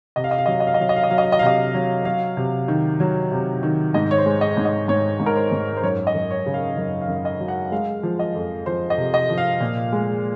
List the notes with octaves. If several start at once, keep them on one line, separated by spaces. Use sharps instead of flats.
C3 D#5
F5
D#5
F5
F#3 D#5
F5
D#5
F5
D#5
F#3 F5
D#5
F5
D#5
F#3 F5
D#5
F5
D#5
F5
C3 D#5
F#3
F#3 F5
C3
D#3
F#3
C3
D#3
G#2 D#5
C#5
C5
G#3
D#5
G#2
D#5
G#2 C#5
G#2
A#4
C5
G#2
C5
F#2 C#5
D#5
F#2
C#5
C#3
F5
F#2
F5
F#2
D#5
F#3
F#5
G#3 F5
F3
D#5
F2
F3 C5
D#5
C3
D#5
F3
F5
A#2
G#3